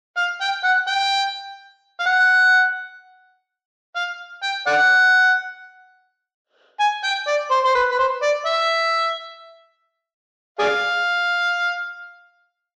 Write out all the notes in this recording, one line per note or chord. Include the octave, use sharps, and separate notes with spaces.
F5
G5
F#5
G5
F5
F#5
F5
G5
D5 F#5
G#5
G5
D5
C5
C5
B4
B4
C5
D5
E5
G#4 D5 F5